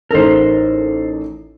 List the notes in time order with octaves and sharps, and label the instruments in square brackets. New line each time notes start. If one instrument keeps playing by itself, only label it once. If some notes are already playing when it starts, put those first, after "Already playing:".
[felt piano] A1 D#4 A4 [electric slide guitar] A#4 C5